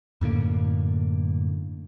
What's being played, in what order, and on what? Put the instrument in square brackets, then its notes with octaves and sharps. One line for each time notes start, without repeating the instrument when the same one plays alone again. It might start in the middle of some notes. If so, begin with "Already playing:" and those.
[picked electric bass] F#2 A2 D3 A#3